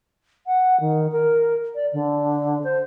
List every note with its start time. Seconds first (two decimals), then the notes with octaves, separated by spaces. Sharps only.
0.46 F#5
0.80 D#3
1.12 A#4
1.75 D5
1.93 D3
2.64 C5